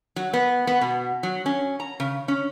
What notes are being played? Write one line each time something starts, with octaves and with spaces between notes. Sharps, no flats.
F#3
B3
B3
B2
F#3
C#4
A#5
C#3
C#4